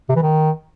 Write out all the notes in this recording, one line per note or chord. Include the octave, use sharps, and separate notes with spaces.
C3
E3
D#3